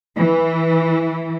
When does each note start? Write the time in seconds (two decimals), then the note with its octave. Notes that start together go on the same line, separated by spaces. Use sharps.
0.16 E3